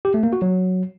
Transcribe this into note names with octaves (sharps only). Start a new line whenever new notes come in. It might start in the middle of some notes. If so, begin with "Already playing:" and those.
G4
A3
A#3
F#4
F#3